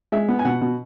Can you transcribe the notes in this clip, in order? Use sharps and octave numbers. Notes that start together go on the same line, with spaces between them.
G#3 E5
B3
G#5
B2 F#5
B2